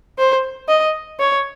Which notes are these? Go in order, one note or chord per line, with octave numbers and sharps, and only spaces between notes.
C5
D#5
C#5